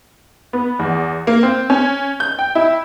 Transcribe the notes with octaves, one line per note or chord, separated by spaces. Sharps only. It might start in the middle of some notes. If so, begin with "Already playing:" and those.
B3
E2
A#3
C4
C#4
G6
G5
E4